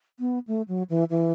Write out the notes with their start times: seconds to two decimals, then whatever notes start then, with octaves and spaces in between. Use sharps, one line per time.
0.20 B3
0.48 A3
0.68 F#3
0.90 E3
1.10 E3